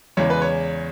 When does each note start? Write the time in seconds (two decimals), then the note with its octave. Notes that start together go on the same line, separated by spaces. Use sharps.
0.17 E2 C#3 G#3 C#5
0.30 B4
0.42 C#5